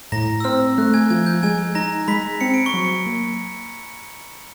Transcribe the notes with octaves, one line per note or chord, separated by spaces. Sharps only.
A2 A#5 A#6
E6
C4 F6
A3 F#6
G#5 G#6
F3 G#5 G#6
G6
G#3 G#5 G#6
D#4 A#5 A#6
G#3 B5 B6
C4 C#7
D7
C#6 C#7
F#3
A#3